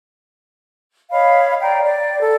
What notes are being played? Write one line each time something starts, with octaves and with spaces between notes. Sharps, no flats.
C#5 D#5 F5 B5
D5 G5 A#5
D5
A4